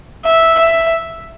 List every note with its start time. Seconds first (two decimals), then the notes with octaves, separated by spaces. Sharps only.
0.25 E5
0.59 E5